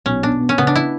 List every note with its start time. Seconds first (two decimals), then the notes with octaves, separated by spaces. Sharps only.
0.06 B1 C#4
0.23 B2 D4
0.40 B3
0.49 C#4
0.58 C#3 B3
0.67 D4
0.75 E4